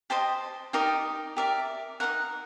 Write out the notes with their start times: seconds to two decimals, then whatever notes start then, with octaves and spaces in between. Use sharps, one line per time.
0.10 G4 C5 D#5 A5
0.73 D#4 G4 A#4 D5 D#5
1.37 G4 A#4 D5 E5
2.00 D#4 F#4 A#4 F#5